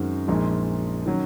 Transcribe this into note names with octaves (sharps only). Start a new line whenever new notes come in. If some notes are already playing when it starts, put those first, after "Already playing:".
Already playing: F#2 D#3 G#3 C4 F#4
A#1 A#2 F3 G#3 D#4
D#3 F#3 C#4